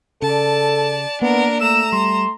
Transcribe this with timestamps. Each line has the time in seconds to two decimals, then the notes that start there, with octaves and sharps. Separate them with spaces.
0.22 C#3 A4 D5 A5
1.21 A#3 B3 D4 A#4
1.61 A3 A#5 E6 E7
1.92 G3 C6